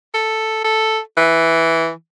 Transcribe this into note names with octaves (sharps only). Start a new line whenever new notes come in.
A4
A4
E3